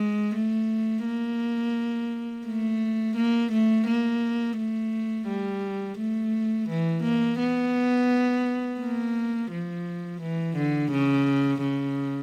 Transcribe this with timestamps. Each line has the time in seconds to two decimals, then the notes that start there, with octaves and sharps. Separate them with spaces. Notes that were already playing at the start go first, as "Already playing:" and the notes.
Already playing: G#3
0.35 A3
1.05 A#3
2.47 A3
3.16 A#3
3.52 A3
3.87 A#3
4.58 A3
5.28 G3
5.98 A3
6.69 E3
7.04 A#3
7.39 B3
8.80 A#3
9.51 F3
10.21 E3
10.57 D3
10.92 C#3
11.62 C#3